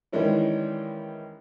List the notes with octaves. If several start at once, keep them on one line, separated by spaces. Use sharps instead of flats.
D#3 E3 G3 G#3 C#4 E4